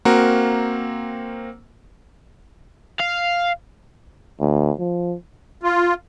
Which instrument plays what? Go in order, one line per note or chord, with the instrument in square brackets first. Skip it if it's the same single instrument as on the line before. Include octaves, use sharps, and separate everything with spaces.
[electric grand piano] A#3 C4 F#4 A#4
[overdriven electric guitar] F5
[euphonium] D2
F3
[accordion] F4